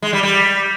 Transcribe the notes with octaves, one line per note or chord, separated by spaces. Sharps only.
G#3
G3
G3